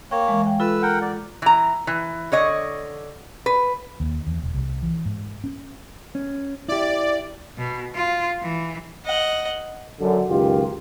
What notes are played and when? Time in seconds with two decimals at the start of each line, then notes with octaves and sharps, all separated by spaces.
0.11 A#3 C#5 G5
0.28 E3 G#3
0.44 F5 G5
0.60 F4 A4 B4 E6
0.82 A#4 F#5 G5
1.02 D5
1.42 E3 A#5
1.87 E3
2.32 D3 C#5 D#5
3.46 B4
4.00 D#2
4.27 E2
4.43 E1
4.54 C2
4.82 E3
5.05 G#2
5.44 C#4
6.15 C#4
6.68 E4 G4 D5
7.58 B2
7.95 F4
8.42 E3
9.05 D#5 F#5
10.00 F#2 D3
10.29 C#2 F#2 D#3 F4 G4